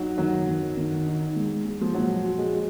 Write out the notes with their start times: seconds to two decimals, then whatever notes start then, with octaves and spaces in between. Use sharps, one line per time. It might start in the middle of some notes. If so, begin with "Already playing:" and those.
Already playing: F#3 D#4
0.18 D#3 F#3
0.48 D#3
0.77 D#3
1.06 D#4
1.36 G#3
1.65 G#3
1.81 F3
1.94 A#2 F#3
2.24 F#4
2.38 G#3
2.53 F#4